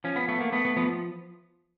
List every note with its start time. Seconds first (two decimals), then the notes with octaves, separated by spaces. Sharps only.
0.04 F3 C#4
0.16 B3
0.28 A3 B3
0.41 A#3
0.52 A3 B3
0.65 B3
0.77 F3 B3